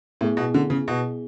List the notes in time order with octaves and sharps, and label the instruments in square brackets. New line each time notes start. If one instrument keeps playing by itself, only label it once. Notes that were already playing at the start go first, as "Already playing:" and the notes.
[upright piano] A2 [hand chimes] B3 E4 G#4
[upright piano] B2
D3
C#3
B2